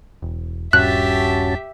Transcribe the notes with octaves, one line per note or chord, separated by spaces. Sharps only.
E1
D#1 G2 C#4 F#4 G4 E5 A5 F#6